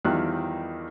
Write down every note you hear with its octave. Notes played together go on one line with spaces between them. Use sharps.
E2 D#3 F3 G3 F#6